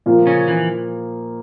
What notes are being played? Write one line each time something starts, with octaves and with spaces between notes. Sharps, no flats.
A#2 F3 A#3 F4
C#3 C#4
E3